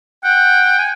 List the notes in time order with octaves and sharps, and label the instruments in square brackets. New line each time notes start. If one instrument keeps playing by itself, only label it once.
[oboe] F#5 [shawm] G5
[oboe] G#5